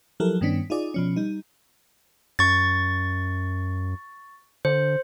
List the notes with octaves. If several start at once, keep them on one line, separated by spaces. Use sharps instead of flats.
F3 F#3 E4 G4 A4 A#4
G2 D#3 B3 C#4 D4 B6
D#4 F4 G#4 D5 D#5
B2 F3 C#4
G3 D#4
F#2 C#6 A6
D3 C5